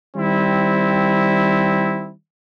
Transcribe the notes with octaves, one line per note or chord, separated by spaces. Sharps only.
D#3 G3 C4 E4